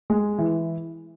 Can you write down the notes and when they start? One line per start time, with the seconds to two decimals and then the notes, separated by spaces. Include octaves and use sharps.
0.10 G#3
0.38 E3